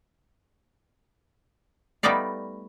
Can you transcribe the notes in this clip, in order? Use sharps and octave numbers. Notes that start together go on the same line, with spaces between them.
G3 A3 B3 D#4 D5 F5